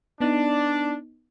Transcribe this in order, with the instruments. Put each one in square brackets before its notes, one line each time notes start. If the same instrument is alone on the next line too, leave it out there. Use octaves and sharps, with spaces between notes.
[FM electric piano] B3 D#4 [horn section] D4